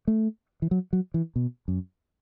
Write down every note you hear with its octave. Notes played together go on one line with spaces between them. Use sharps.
A3
E3
F#3
F#3
E3
B2
F#2